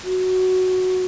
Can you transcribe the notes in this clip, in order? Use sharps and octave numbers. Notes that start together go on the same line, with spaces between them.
F#4